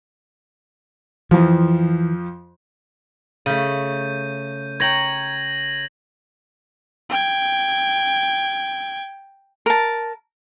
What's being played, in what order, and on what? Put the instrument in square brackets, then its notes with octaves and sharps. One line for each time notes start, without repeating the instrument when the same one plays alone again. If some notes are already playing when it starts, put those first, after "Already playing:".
[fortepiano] F2 F3 [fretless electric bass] E3
[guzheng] C#3 A3 [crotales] G6 D#7
[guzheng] C#5 G5 A#5 [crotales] G#6 A#6 F#7
[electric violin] G5 G#6
[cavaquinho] A#4 A5